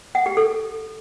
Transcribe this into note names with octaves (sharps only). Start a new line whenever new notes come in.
F#5
G4
A4